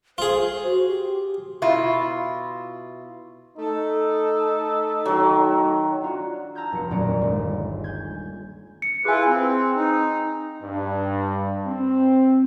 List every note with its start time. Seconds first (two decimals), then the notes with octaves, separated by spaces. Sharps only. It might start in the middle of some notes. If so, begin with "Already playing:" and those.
0.18 F4 G#4 C5
0.64 F#4
0.87 G4
1.62 B2 E4 F4
3.58 A3 D#4 A4
5.05 D#3 F#3
6.02 D4 F4 F#4
6.55 A5 A#5 E6 F6 G6 G#6
6.73 F1 C#7
6.91 D#1 F2 A#2 F#3 C#4 D5
7.21 G1 G#3
7.84 G#5 G6 G#6
8.82 C#7
9.05 E4 F4 G#4 B4 G#5
9.26 C4
9.75 D#4
10.62 G2
11.66 C4